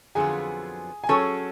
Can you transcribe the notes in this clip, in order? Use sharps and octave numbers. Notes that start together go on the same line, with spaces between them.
F2 D3 F#3 B3 F4 G#4 G#5
G#5
F#3 C#4 G#4 A4 C#5 A5